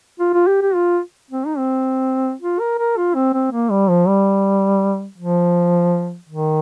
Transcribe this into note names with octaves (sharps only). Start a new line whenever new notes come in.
F4
F4
G4
G4
F4
C4
D#4
C4
F4
A#4
A#4
F4
C4
C4
A#3
G3
F3
G3
F3
D#3